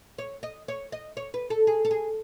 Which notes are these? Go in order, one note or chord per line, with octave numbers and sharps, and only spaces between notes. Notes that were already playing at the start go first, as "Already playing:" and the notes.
C#5
D#5
C#5
D#5
C#5
B4
A4
G#4
A4
G#4